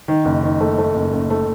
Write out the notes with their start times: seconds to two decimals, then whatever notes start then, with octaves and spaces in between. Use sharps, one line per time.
0.08 D#3
0.25 F#1
0.43 D#3
0.60 A3
0.78 A3
0.96 F#1
1.13 F#1
1.30 A3